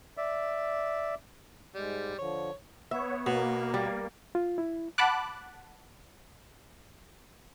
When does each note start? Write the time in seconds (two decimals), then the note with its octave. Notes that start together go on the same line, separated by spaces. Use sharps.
0.17 D5 E5
1.75 G#2 G3 G#3
2.18 D3 F3 C#5
2.91 B3 C#5 E5
3.26 B2 A#3 B3
3.74 G3
4.35 F4
4.58 E4
4.98 F#5 A5 B5 D6 F#6